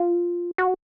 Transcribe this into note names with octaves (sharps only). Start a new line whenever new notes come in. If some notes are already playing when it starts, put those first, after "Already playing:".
Already playing: F4
F#4